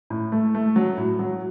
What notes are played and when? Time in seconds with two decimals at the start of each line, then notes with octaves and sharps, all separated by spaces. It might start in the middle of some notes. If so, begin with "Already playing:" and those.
0.10 A2
0.32 A3
0.55 A3
0.76 F#3
0.97 A2
1.19 F#3